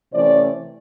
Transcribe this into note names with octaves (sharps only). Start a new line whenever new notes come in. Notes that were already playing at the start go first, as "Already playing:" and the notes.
C3 E3 A3 C#4 C5 D5